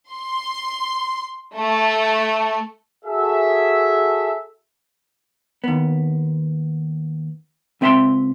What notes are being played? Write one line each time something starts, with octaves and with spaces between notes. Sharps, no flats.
C6
A3
F#4 G#4 A4 E5
D#2 B3
C#2 C4 D#5 E5 A5 C6